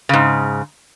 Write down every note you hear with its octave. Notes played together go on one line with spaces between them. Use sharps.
G#2 C#3